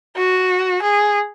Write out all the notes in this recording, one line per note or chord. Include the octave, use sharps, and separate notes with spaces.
F#4
G#4